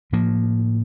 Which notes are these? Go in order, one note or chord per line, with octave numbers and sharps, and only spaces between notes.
A2 F3 A#3